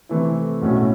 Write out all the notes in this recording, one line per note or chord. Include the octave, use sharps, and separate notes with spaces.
C3 E3 A3 C4 E4
B1 A2 F#3 A3 C#4